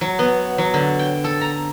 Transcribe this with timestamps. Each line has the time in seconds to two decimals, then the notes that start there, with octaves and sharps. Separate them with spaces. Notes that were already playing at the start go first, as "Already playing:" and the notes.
0.01 F#3
0.19 B3
0.58 F#3
0.74 D3
0.99 G5
1.24 A4
1.41 A#5